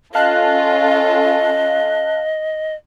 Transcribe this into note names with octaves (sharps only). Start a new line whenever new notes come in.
C#4 F4 A4 D#5 F5 A5 F#6